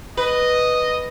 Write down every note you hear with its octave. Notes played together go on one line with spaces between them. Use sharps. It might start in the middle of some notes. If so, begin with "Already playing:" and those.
B4 D#5